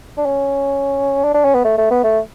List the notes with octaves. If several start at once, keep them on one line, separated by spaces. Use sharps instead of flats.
D4
C#4
D4
D4
C#4
B3
A3
A3
B3
A3